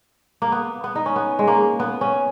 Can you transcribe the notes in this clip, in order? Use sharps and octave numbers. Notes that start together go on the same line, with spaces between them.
A#3
B3
B3
D#4
C#4
B3
G#3
A#3
B3
C#4